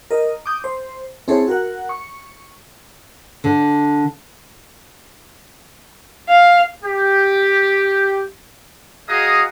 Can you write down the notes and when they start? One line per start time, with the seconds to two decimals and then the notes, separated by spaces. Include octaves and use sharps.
0.11 A#4 D#5
0.46 D6 D#6 G6
0.64 C5
1.28 C4 E4 G#4 A4 C5 C#5
1.48 F#4 A#4 F#5
1.89 C#6
3.44 D3
6.29 F5
6.84 G4
9.08 F#4 G#4 D#5 F5 A#5 D#6